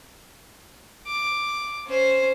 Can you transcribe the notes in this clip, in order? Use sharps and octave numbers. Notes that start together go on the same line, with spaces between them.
D6
C#4 C5